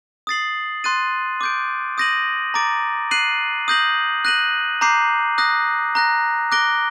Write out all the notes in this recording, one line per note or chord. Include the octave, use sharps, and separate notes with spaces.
D#6 A6 C7 F#7
C6 F#6 A6 D#7
D6 G6 D7
D#6 G6 A#6 D#7 F#7
A#5 D6 A6 D7
F#6 C7 D#7 F#7
D#6 G6 A#6 F#7
F#6 A#6 D#7 F#7
A#5 D6 G6 C7
D#6 F#6 A#6
A#5 F#6 A#6
D6 F#6 A#6 D7 G7